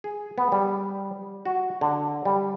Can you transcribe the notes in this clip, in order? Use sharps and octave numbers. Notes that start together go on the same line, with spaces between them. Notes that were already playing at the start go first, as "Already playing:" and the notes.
G#4
B3
G3
F#4
D3
G3